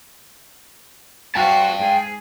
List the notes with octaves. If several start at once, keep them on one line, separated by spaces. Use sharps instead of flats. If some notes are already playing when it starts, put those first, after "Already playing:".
F#4 C5 G5 A5
G#2 G#4